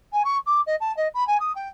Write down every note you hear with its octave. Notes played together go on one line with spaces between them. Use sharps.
G#5
C#6
D6
D#5
A5
D#5
B5
G#5
D#6
G5